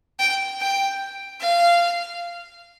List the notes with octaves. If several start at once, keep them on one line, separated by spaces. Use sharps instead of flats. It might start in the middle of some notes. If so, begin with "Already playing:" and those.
G5
G5
F5